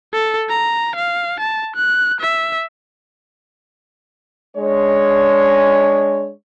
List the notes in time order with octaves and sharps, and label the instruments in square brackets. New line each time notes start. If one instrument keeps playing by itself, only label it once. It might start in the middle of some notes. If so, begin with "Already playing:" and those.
[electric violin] A4
A#5
F5
A5
F#6
E5
[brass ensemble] G#3 D4 C#5